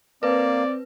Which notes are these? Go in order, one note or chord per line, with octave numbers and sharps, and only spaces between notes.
A#3 C4 B4 D5